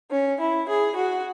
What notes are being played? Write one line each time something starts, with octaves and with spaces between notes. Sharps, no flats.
C#4
E4
G#4
F#4